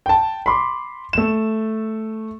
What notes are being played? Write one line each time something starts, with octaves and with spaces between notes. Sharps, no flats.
G5 A5
B5 C6 D6
A3 E7